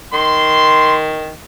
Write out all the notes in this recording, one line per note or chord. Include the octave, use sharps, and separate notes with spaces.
D#3 C6